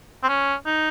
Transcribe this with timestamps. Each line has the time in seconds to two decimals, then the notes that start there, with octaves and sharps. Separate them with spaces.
0.23 C4
0.29 C#4
0.66 D#4